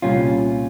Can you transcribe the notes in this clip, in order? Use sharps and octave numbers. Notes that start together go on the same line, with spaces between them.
C2 A#2 G3 C#4 F4